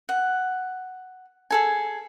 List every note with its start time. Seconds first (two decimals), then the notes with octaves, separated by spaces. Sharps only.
0.09 F#5
1.51 G#4 A4 G#5